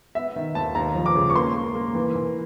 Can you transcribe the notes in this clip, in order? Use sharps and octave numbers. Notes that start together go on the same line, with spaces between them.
B3 E5
D#3
D#2 A5
D#2 A#5
F3
D6
C#3
C#6
A#3 C6
A#3
A#3
E3
E3